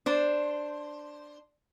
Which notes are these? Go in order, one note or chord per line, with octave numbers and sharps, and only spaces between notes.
D4 C5